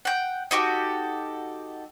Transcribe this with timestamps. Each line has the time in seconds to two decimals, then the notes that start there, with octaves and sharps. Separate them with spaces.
0.05 F#5 G5
0.51 D#4 F#4 G4 A4